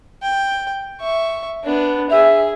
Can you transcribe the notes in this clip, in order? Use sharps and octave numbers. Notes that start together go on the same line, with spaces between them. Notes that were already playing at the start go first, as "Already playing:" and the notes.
G5
E5 C#6
B3 D4
G#4 E5